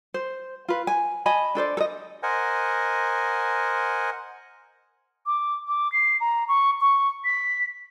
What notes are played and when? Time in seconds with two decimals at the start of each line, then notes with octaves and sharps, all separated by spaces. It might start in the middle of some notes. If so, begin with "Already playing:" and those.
0.14 C5
0.68 F4 B4
0.87 G#5
1.26 D#5 G#5 A5 B5
1.55 D4 A4 C5 D5
1.77 A4 D#5
2.23 A#4 C5 D#5 F#5 G#5
5.26 D6
5.67 D6
5.92 C7
6.21 A#5
6.48 C#6
6.81 C#6
7.25 B6